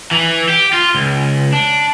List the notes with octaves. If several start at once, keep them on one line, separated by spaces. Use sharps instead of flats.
E3
G4
F4
C#2
D4